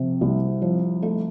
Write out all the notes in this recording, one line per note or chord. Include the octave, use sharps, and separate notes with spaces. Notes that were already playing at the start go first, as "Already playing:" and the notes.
Already playing: C3 F3
C2
F3
A3